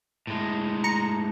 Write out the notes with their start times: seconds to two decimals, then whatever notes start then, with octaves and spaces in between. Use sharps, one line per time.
0.27 A2 G#3
0.84 A#5 C#7